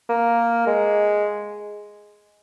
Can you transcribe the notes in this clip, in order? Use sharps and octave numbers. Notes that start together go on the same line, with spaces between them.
A#3
G#3